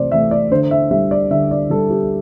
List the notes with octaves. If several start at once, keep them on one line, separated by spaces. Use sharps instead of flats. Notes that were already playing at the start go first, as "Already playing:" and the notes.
Already playing: C3 E3 A3 C5 D5
E3 A3 E5
D5
D3 C5
E5
G3 E5
D5
D3 E5
D5
G3 A4
G4